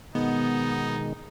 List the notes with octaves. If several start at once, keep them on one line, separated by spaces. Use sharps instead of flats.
B2 D#3 G#3 B3 D#4